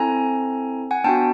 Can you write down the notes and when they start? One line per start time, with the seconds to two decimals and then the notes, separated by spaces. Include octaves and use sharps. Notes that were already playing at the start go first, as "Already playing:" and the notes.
Already playing: C4 E4 A4 G#5 A#5
0.91 F#5 G#5
1.04 B3 D4 F#4 G5 A5